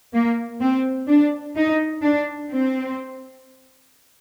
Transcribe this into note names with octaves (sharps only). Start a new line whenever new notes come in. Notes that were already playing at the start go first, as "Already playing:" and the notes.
A#3
C4
D4
D#4
D4
C4